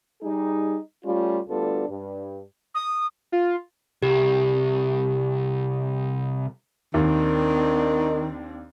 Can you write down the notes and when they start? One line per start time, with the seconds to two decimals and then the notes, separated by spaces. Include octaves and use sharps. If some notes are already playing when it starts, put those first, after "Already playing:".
0.23 G3 D#4 G#4
1.05 G3 A3 C#4 F4
1.49 D2 G3 B3 D4 F4 A4
1.90 G2
2.74 D#6
3.32 F4
4.02 C2 G4
6.94 D#2 D#3 C4 D4